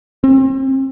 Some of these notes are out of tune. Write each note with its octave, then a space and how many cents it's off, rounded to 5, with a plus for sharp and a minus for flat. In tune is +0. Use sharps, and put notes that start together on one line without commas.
C4 +40